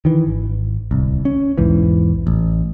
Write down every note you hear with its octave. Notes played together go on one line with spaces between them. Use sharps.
D#3 E3
G#1
D1 C2
C#4
B1 E2 G#2 E3
A1